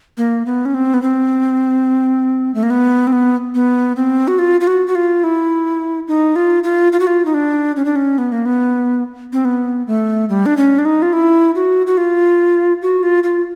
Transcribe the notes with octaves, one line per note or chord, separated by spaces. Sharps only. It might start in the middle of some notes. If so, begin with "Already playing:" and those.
A#3
B3
C#4
C4
B3
C4
A3
A#3
B3
C4
B3
B3
C4
F#4
F4
F4
F#4
F#4
F4
E4
D#4
F4
F4
F4
F#4
F4
D#4
D4
C#4
D4
C#4
B3
A#3
B3
C4
B3
A3
G3
D4
C#4
D4
D#4
F4
E4
F#4
F#4
F4
F#4
F4
F4